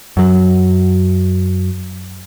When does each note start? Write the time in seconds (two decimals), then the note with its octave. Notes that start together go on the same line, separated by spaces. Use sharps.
0.17 F#2 F#3